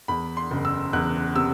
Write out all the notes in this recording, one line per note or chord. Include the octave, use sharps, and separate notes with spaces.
E2 B5
C6
F#1
E6
E2 F#6
C3 E6